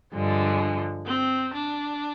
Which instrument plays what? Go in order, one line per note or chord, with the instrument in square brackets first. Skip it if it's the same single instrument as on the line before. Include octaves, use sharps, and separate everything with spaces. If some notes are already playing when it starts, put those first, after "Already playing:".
[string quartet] G2 D3 F3 G#3
[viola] C4
D4